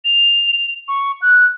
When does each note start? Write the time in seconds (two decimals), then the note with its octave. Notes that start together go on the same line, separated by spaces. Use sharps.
0.05 F7
0.88 C#6
1.22 F#6